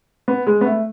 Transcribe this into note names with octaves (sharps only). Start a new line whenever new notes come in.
B3
G#3
B3
A3